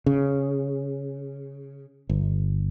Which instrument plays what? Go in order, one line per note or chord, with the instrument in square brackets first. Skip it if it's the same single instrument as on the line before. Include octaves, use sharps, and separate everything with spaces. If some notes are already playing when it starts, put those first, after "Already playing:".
[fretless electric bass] C#3
G1